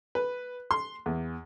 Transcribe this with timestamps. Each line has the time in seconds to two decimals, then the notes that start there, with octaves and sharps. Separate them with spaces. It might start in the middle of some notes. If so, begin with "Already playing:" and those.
0.15 B4
0.71 C6
1.06 E2